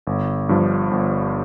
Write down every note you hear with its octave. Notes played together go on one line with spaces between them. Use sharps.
G1
G2 F3
G1